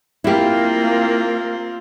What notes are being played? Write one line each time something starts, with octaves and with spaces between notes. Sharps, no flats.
A#3 C4 E4 F4 G4